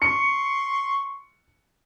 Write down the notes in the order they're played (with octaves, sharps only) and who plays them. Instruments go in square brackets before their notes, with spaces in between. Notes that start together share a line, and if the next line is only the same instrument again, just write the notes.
[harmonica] C6 C#6 [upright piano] C#7